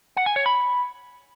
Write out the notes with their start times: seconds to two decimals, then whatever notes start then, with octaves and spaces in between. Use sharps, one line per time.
0.17 F#5
0.26 G#5
0.36 C#5
0.46 B5